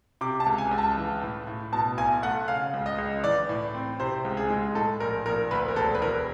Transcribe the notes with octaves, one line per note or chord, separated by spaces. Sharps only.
C3 D6
A5
C#2
G#5
C#2
A5
E3
A2
A2
B2 A5
B1 G#5
A3 F#5
C#3 F5
C#2
D#5
C#2
E3 D5
A2
C4
C3 C5
C#2
G#4
G#3
A2 A4
A#1 A#4
A#1 A#4
D2 B4
A#4
E1 A4
B4
E3 A#4